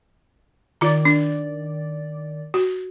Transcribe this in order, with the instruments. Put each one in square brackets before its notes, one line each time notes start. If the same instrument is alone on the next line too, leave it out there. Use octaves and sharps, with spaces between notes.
[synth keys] D#3 D5 [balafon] F4 A#5
[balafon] D4
F#4